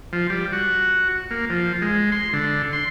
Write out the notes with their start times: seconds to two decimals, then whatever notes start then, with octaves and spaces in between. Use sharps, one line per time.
0.13 F3
0.30 G3
0.52 F#4
1.31 A#3
1.50 F3
1.82 G#3
2.12 C6
2.33 D3
2.73 C6